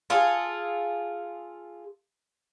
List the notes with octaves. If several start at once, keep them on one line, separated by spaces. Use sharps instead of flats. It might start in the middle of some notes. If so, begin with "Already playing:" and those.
F4 G#4 A4